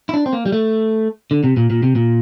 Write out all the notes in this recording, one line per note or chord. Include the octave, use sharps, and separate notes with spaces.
E4
D4
C4
A#3
G3
A3
D3
C3
A#2
A#2
C3
A#2